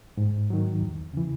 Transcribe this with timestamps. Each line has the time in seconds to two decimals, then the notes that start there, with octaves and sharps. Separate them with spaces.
0.17 G#2
0.50 D#3 F#3
0.81 E2
1.14 C#3 E3